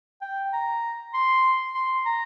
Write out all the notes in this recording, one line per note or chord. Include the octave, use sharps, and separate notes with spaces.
G5
A#5
C6
C6
A#5